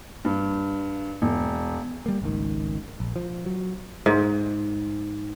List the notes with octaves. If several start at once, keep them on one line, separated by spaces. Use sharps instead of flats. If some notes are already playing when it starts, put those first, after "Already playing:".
G2
E1
G3 A#3
G#1 C#2 D#3
A#1
F3
F#3
G#2